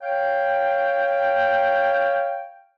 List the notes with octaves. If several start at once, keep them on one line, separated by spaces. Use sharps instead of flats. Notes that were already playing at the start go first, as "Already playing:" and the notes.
C#5 F5 G5